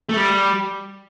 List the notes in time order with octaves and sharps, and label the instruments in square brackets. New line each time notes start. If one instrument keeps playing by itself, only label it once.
[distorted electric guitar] A3
G3